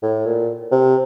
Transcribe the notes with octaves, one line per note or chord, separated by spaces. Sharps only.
A2
A#2
C3